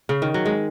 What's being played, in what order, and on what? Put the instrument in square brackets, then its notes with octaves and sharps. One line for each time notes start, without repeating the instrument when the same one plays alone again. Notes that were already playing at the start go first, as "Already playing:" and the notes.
[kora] C#3
D#3
F#3
G#3